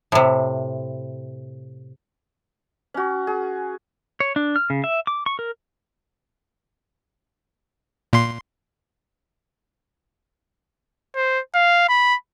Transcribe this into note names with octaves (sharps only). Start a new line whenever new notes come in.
A2 C3
C#4 F#4
G#4
C#5
D4
F6
C#3
E5
D6
C#6
A#4
A#2 C6
C5
F5
B5